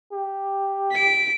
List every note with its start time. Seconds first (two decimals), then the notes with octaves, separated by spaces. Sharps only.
0.12 G4
0.92 B6 D7